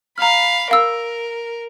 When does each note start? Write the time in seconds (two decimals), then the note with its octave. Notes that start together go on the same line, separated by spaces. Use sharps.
0.18 F5 A#5 B5 F6
0.71 A#4 F5 E6